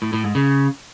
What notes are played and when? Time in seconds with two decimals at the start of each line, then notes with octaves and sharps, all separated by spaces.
0.02 A2
0.13 A2
0.24 G#2
0.35 C#3